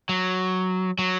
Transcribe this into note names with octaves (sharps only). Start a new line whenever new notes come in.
F#3
F#3